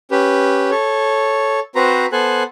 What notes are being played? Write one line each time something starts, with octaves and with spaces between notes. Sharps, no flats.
C#4 G4 B4
A4 C#5
C4 F#4 B4 C5 A#5
B3 A4 C5 G#5 F#6